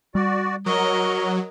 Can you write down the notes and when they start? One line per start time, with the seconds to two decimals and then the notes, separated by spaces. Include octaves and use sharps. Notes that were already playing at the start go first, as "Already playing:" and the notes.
0.15 G3 F#4 D5
0.66 F#3 A#4 D#5 A#5 C#6